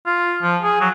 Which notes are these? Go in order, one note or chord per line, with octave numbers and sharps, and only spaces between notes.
F4
F3
G#4
F#3